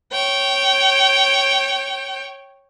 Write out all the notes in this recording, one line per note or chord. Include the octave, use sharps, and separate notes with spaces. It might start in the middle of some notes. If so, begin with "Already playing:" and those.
C#5 G5